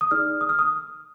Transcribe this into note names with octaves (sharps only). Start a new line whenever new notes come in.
D#6
D#4 G#4 D5 F6
D#6
F6
D#6